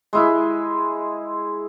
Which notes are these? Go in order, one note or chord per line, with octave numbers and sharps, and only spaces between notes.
G#3 E4